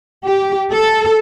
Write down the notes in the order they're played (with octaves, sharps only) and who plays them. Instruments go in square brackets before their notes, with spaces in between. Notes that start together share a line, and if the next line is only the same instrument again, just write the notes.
[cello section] G4
A4